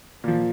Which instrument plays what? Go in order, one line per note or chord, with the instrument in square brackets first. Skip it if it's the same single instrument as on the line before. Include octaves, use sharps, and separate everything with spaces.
[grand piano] A#2 F3